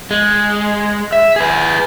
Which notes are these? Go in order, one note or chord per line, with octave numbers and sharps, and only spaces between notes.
G#3
E5
G#4 B4